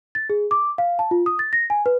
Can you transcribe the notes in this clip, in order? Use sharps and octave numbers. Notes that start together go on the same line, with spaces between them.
A6
G#4
D6
F5
A5
F4
D#6
A6
A#6
G#5
B4